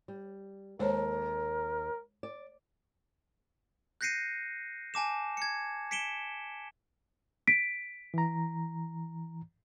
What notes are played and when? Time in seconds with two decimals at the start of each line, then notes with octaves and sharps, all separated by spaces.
0.08 G3
0.79 D#2 G#3 A4 A#4 C5 C#5
2.23 D5
4.01 F#6 G6 A#6 C7 C#7 D#7
4.94 G#5 A5 D6 E7
5.37 G#6 C#7
5.91 B6 C#7 D7 E7 G7
7.47 B6 D7
8.14 E3 A#5